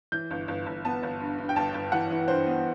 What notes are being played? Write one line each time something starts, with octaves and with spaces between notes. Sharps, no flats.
E3 G6
G1
G1
G1
B3 A5
G1
G2
G2
G5
G1 A5
G1
E3 F#5
E3
G2 C5
B3